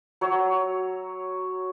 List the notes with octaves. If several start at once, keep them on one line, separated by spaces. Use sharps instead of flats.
F#3 C#5 E6